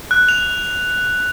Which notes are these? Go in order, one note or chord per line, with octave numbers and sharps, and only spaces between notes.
F#6
F7